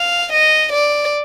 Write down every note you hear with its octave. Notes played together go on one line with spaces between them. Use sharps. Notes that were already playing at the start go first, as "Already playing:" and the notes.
Already playing: F5
D#5
D5